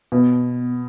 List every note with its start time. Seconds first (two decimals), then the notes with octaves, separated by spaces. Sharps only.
0.12 B2